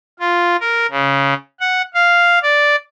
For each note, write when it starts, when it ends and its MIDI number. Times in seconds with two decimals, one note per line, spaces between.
0.19 0.56 65
0.61 0.87 70
0.91 1.34 49
1.60 1.82 78
1.94 2.39 77
2.42 2.76 74